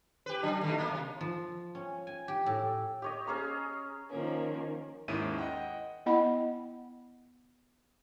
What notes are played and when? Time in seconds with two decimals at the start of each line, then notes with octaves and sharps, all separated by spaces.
0.26 G4 B4
0.43 F#3 D4
0.62 B2 D#3 A3
0.78 A#3
0.90 C3
1.21 F3
1.75 C#4
2.07 G#5
2.28 G4
2.46 A2
3.02 G4 C#5 D#5
3.27 C#4 G#4 C#5 A#5
4.10 D#3 F3 A#3 C#4
5.08 D#2 G#2 D#3 C#4 E4 D#7
5.38 D#5 F#5 G5
6.06 B3 E4 D#5 F#5 B5